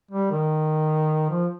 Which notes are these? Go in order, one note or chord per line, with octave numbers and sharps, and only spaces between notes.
G3
D#3
F3